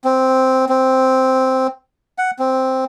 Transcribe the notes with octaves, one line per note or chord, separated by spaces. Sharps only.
C4
C4
F#5
C4